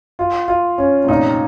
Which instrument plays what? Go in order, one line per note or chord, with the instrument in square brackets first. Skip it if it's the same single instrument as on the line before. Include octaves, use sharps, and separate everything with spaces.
[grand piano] F4
F4
C#4
[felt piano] C3
[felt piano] A#2 [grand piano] D#4